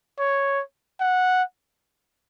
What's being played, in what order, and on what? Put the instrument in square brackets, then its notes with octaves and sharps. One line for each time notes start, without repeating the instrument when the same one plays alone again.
[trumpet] C#5
F#5